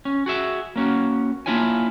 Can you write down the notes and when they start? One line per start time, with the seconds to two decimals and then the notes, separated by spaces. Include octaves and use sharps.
0.05 C#4
0.26 F#4 G#4 E5
0.76 A#3 C#4 F#4
1.46 A#3 D4 E4 F4 C#5 G#5